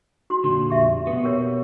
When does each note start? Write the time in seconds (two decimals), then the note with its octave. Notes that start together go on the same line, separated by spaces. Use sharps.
0.30 F#4 C6
0.44 F2 A#2 D3
0.70 G4 E5
1.07 B2 B3
1.24 G4 A#4 C#5